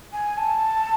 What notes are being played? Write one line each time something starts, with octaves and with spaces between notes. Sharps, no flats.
G#5
A5